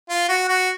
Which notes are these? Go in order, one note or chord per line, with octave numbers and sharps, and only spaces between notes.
F4
F#4
F#4